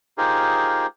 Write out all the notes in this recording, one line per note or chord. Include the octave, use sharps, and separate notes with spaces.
D#4 F4 G4 G#4 A#4 C5